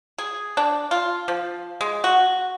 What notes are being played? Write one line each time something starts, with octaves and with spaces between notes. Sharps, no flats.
G#4
D4
F4
F3
G#3
F#4